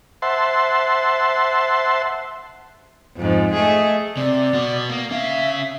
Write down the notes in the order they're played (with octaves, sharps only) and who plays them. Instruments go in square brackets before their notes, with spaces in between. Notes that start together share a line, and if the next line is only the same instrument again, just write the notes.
[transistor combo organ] C5 E5 F#5 A5 C6
[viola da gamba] F2 G#2
A3 G#4 D#5
[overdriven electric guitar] C3 [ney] D5
[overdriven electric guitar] B2 F#4
A#3
[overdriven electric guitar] C#4 F5 [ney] E5